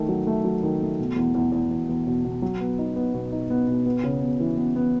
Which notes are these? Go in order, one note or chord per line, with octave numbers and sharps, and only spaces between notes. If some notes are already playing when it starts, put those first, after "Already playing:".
Already playing: D#3 A3
F#3
A3
F#3
D#3
A3
B2
E2
E2
E2
E2
E2
B2
B2
F#3
B3
D#4
B3
B2
D#4
B3
B2
B3
C#3
B3
E3
B3
B3